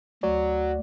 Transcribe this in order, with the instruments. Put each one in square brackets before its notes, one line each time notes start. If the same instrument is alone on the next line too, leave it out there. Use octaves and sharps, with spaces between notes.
[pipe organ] D2 [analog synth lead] F#3 [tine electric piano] D5